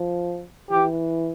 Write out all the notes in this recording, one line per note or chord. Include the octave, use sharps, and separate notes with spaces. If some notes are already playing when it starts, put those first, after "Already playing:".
Already playing: F3
E3 G4